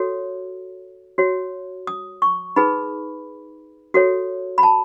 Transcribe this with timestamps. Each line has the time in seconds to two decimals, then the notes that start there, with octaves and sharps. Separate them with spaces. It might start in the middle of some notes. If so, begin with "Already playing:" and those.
Already playing: F#4 A4 C#5
1.18 F#4 C#5
1.87 D#6
2.22 C#6
2.56 D#4 G#4 B4 B5
3.94 F#4 A4 C#5
4.58 B5
4.63 A5